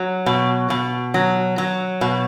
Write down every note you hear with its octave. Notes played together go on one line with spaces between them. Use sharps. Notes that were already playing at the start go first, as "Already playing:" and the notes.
Already playing: F#3
B2
B2
F#3
F#3
B2